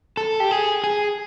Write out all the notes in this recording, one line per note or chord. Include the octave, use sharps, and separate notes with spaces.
A4
G4
G#4
G#4